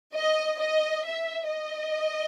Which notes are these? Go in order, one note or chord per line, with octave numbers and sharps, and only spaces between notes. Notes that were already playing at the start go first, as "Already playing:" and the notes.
D#5
D#5
E5
D#5